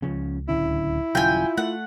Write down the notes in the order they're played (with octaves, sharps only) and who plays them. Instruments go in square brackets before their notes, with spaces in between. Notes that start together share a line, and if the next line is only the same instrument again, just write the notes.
[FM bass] C#2 [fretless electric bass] C#3 F3 C#4
[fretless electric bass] D1 D3 C#4 [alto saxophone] E4
[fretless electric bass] D#1 C#3 F#3 [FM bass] F4 [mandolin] G5 G#5
[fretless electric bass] A3 [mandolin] F#5